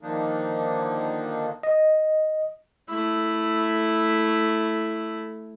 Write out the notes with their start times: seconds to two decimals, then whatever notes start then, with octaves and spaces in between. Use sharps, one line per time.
0.01 D3 D#3 F3 A#3 D4 D#4
1.63 D#5
2.89 A3 E4